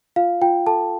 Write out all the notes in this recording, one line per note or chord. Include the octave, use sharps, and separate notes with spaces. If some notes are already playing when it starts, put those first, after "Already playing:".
F4 F5
F4 G5
A4 A5